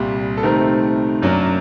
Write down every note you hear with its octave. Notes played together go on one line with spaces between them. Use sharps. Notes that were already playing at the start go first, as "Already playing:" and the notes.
Already playing: C2 A#2 G3
A4
C3 D#3 A3 C4 A#4
F#2 F#3 A#3 D4